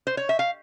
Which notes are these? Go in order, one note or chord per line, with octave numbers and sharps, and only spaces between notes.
C5
C#5
E5
F5